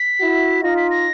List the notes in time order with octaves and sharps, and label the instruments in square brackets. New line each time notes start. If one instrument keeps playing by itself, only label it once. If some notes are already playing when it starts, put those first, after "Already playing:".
Already playing: [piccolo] B6
[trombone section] E4 F#4
[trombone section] D#4 F4 [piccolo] A#6
[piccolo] B6
A#6